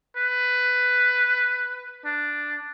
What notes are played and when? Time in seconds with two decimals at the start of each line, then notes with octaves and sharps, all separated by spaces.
0.16 B4
2.05 D4